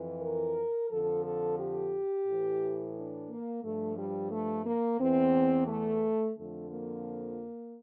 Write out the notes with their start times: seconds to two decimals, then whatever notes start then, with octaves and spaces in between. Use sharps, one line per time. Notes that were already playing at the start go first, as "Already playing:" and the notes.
Already playing: F2 E3
0.22 A#4
0.91 F2 D3 F3 A4
1.25 A4
1.59 G4
2.27 A2 E3
2.96 D4
3.29 A#3
3.63 G2 F3 A3
3.97 G3
4.31 A3
4.66 A#3
4.99 E2 E3 C4
5.68 A3
6.36 F2 D3 F3 A3
6.70 A#3